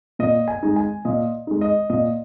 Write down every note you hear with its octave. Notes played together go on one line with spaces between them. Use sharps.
A#2 D#5
G#5
G#3 D#4
G#5
A#2 D#5
G#3 D#4
D#5
A#2 D#5